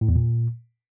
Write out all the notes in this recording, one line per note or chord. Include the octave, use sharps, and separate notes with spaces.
A2
E2
A#2